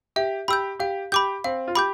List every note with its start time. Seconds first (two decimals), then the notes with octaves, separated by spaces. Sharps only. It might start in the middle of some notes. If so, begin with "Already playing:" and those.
0.16 G4 E5
0.48 G4 B5 E6 G6
0.80 G4 F5
1.12 G4 B5 D6 G6
1.44 C4 F5
1.68 F4
1.75 G4 B5 D6 G6